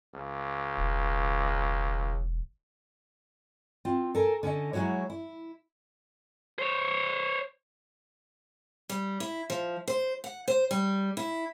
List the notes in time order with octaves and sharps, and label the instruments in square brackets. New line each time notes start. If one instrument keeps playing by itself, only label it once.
[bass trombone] C#2
[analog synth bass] E1
[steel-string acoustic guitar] C4 F4
A4 A#4 G#5
D3 C#4 A4 D#5
F#3 G#3 E4 F#4 C#5
E4
[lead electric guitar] C5 C#5
[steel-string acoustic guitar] G3
E4
F3
C5
F#5
C5
G3
E4